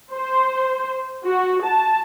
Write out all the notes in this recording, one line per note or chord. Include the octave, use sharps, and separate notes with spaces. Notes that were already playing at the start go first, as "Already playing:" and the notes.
C5
F#4
A5